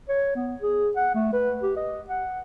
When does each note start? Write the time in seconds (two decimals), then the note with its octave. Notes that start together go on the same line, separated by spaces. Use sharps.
0.09 C#5
0.36 B3
0.62 G#4
0.97 F#5
1.15 A3
1.33 B4
1.63 G4
1.77 D#5
2.09 F#5